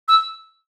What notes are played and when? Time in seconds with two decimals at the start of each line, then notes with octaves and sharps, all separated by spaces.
0.08 E6